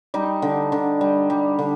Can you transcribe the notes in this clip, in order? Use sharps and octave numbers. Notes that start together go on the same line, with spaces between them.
G3 D#4
D3
D3
G3
G3
D3